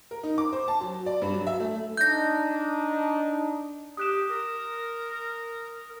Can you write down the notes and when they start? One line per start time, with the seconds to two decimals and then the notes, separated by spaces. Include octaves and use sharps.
0.11 A#4
0.23 D#4
0.38 D6
0.53 C5
0.68 A5
0.81 F#3
1.06 D5
1.22 G2
1.34 F#3
1.47 E5
1.60 A3
1.97 D4 D#4 G6 A#6
3.97 G4 D#6 F#6 E7
4.29 A#4